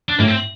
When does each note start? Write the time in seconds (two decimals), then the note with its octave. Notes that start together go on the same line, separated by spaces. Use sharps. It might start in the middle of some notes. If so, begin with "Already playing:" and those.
0.09 D4
0.18 A2 A#3
0.27 C4